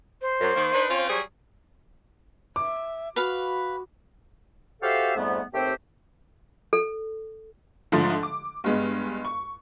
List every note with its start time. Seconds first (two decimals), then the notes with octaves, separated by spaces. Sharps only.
0.21 C5
0.40 F#2
0.55 D#3 A#3
0.73 D4 D#4 B4
0.90 C4 C#4 F4
1.09 F#3 G3 G#4
2.56 E5 D6
3.16 F#4 B4 F5 B5
4.83 F#4 G4 A4 C5 E5 F5
5.16 F2 G#2 G3 A3 B3
5.54 D#2 A3 C4 G4 C5 G5
6.73 A4
7.92 G#2 D3 F3 A3
8.23 D6
8.64 G2 G#3 B3
9.25 C#6